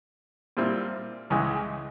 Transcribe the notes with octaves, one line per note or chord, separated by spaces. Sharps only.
A#2 G3 C4 E4
C#2 C#3 E3 G#3